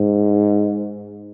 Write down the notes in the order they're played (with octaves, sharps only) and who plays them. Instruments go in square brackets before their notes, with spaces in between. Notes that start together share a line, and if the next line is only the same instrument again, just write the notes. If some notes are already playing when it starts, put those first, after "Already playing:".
Already playing: [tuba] G#2